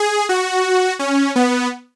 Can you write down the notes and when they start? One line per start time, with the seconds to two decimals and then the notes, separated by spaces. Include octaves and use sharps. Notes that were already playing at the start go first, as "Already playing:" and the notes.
Already playing: G#4
0.29 F#4
0.99 C#4
1.36 B3